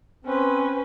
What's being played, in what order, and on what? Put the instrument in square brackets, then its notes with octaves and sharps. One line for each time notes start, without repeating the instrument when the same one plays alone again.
[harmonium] C4 [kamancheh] C#4 B4